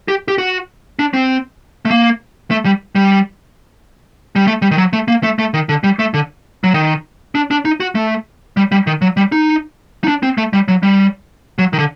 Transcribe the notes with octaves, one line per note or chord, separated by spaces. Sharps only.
G4
G4
F#4
D4
C4
A3
A#3
A3
G3
G3
G3
A3
G3
D#3
F#3
A3
A#3
A3
A3
D#3
D3
G3
A3
D3
F#3
D#3
D4
D4
D#4
F#4
A3
G3
G3
D#3
F#3
G3
D#4
D#4
D4
C4
A3
G3
F#3
G3
F#3
D#3
D3